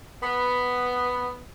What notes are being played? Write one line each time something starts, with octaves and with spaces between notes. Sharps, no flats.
B3